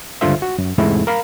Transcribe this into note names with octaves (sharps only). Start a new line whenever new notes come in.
C#2 G2 D3 F4 C5 E5
F#4
F#2
E2 G#2 C3 G#3 A3 E4
A#4 F5 B5